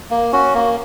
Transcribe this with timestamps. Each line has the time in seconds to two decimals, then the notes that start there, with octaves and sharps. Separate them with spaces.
0.11 A#3
0.33 C#4 F#4
0.54 A#3